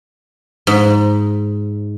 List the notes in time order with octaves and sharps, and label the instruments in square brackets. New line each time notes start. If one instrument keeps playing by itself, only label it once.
[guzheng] G#2